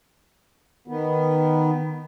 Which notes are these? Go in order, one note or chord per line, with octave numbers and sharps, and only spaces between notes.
D#3 B3